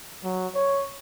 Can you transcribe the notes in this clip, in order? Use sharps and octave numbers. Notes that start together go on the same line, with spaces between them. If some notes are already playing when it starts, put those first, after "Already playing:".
F#3
C#5